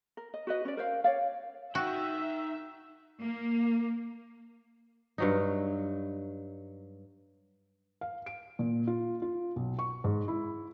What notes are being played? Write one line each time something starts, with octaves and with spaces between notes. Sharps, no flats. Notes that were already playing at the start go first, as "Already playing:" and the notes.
A#4
D#5
F#4 B4 D#5
C#4 D5
A#4 C5 D5 F5
C#5 D5 F5
D#4 F#4 E5 G5
A#3
G2 F#3 D#4
F5
D7
A#2
F4
F4
B1
C#6
G#2
E4